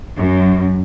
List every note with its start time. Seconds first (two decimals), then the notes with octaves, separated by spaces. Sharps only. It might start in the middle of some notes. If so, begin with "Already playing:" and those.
0.18 F#2